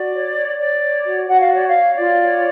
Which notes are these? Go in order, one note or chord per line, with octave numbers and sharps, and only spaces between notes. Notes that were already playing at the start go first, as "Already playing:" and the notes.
Already playing: F#4 D5
C#5
C#5
C#5 D5
C#5
F#4
F#4 F#5
F5
C#5 D5
F5
C#5
F4 D5
C#5